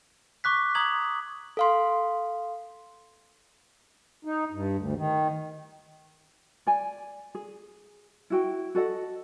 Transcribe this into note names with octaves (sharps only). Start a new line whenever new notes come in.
C#6 D6 F#6 B6
A#5 D#6 G#6 F#7
A4 F5 C6
D#4
G2
D2
D#3
D5 G#5
G#4
E4 F#4 G5
F#4 A4 D#5 F#5